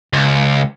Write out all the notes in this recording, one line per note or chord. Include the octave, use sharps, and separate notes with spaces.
C#2